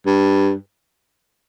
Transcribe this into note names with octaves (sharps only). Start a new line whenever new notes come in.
G2